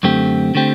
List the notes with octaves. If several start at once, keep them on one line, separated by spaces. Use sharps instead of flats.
F#2 D3 A3 C4 G4
D3 A3 C4 G4